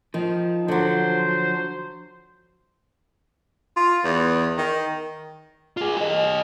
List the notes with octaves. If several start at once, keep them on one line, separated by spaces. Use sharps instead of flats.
D#3 F3
D3 F#3 C5
F4
E2
D#3
F4 G#4
G4 D#5